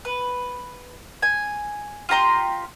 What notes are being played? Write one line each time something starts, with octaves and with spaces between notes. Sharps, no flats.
B4
G#5
F4 G4 A#5 C6